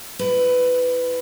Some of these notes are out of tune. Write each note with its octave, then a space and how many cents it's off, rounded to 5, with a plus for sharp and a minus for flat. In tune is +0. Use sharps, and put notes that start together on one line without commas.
E4 +0 B4 +15